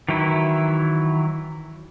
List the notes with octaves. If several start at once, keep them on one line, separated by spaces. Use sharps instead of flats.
D#3 E3 F#3 E4